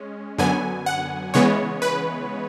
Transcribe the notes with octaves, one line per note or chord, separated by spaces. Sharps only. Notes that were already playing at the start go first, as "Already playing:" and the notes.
Already playing: G#3 C#4
F#2 D3 F#3 B3 G#5
F#5
C#3 E3 G#3 B3 C#5
B4